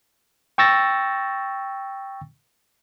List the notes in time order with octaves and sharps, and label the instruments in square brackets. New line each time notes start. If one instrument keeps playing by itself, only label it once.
[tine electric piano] G5 C#6 E6 A6 A#6